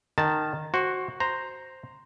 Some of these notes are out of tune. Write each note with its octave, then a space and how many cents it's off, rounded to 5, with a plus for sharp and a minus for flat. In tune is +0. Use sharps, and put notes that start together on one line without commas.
D#3 -15 A5 +0
F#4 +0 C5 +25
C5 +0 A#5 +0